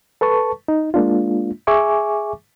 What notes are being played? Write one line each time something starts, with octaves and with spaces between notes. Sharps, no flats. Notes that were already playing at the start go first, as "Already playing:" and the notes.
A4 B4 A5 C#6
D#4
G#3 A#3 D4 F4
G#4 E5 G#5 C#6 D6